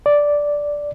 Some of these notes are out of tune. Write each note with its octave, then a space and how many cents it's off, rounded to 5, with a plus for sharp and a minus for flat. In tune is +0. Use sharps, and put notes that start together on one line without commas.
D5 -5